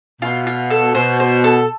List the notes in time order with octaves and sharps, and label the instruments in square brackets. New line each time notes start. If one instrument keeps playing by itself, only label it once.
[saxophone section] B2 [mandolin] F4
[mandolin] F4
A4
[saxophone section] B2 [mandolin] C5
[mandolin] C5
A4